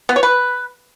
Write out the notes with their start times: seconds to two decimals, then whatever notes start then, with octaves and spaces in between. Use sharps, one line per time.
0.09 B3
0.16 C#5
0.23 B4